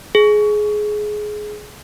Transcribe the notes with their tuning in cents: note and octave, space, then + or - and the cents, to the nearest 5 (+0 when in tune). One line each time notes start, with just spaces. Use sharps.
G#4 +15